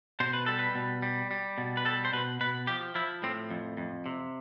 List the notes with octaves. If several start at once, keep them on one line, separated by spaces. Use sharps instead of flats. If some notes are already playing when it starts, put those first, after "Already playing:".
B2 C5
B4
G3 A4
B4
B2
G3
G3
B2
B4
G3 A4
C5
B2 B4
B2 B4
F3 G4
F3 E4
A2 C4
F2
F2
C3